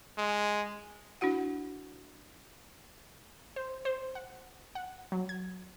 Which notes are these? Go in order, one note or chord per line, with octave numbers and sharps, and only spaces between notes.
G#3
D4 E4 F#4 F#5
C5
C5
F#5
F#5
F#3
G#6